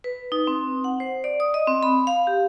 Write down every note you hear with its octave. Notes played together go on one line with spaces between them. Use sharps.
B4
D#4
C4
F#5
C5
D5
D#6
D#5
C4
B5
F5
G4